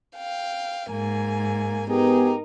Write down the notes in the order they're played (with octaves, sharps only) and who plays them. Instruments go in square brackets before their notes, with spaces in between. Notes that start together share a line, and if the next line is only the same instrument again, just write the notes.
[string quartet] F5 G5
G#2 A#3 G#5
[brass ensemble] B3 G4 G#4 [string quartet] D#4 A#4